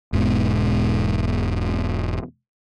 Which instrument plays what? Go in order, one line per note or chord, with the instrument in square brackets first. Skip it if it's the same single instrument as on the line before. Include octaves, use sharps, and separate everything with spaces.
[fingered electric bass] E1 G#2 B2